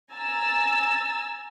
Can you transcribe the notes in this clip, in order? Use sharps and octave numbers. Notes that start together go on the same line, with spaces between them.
G#5 A#5 E6 A6